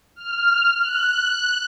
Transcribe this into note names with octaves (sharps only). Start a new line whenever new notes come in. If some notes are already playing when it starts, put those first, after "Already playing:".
F6
F#6